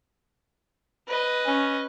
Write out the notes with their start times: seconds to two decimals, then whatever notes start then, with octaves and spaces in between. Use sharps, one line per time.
1.08 B4 D#5
1.46 C#4